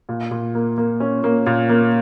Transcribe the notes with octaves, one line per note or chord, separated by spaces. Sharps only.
A#2
A#2
A#3
A#3
C#4
A#3
A#2
A#3